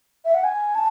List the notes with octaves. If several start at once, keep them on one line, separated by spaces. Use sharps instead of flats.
E5
F#5
G#5
A5